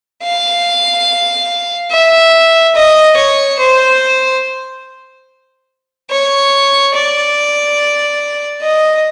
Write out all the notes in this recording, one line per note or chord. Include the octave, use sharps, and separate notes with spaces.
F5
E5
D#5
C#5
C5
C#5
D5
D#5